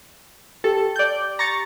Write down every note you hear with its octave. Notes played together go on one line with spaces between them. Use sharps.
G4 A4
D5 G6
A#5 C#6 A6